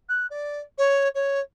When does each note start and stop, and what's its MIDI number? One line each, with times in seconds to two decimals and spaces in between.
0.09 0.26 90
0.30 0.59 74
0.78 1.08 73
1.14 1.39 73